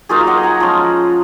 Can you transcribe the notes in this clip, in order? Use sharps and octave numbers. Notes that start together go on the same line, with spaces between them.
F#3 A#3 D#4 F4 G#4
F5
D#5 F#5
G#5
F#5 A#5
F3 G#3 C#4 F4